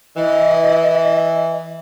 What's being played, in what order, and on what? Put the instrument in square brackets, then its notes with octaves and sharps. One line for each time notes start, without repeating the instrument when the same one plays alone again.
[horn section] E3 [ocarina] D#5